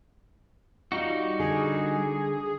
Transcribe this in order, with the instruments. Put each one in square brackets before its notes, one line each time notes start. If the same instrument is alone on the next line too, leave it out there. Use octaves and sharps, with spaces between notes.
[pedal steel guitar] G3 D#4 F#4 [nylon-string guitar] F4
[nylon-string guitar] D3 [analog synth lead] G#4